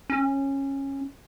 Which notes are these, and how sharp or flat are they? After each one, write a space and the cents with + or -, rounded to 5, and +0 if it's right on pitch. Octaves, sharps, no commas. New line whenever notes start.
C#4 -15